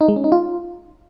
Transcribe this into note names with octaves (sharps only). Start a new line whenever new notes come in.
D#4
G#3
C#4
D#4
F4